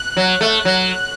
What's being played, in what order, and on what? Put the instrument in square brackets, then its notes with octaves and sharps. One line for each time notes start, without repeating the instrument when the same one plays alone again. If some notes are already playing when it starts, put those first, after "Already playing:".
Already playing: [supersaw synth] F#6
[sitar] F#3
A3
F#3